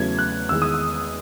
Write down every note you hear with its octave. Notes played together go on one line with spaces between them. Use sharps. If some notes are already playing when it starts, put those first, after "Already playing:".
Already playing: E2 C#3 F#3 A3 G#6
F#6
E2 D#3 G#3 E6
D#6
E6